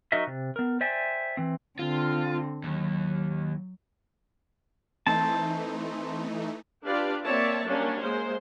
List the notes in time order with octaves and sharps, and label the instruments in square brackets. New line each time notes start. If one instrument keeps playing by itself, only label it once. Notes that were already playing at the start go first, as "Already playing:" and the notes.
[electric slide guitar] F#3 D#4 F#4 A#4 D#5 E5
C3
B3 A#4
C5 D5 E5 G5 G#5
E3 C4
[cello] D3 C4 [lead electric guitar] F4
[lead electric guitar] D#2 [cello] F#3
[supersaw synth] E3 A3 D#4 [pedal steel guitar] C4 A5
[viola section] D4 F4 G4 B4 D5 F5
A#3 C4 C#5 D5 E5 A5
F#3 G3 A#3 C#4 D4
G#3 A#3 C5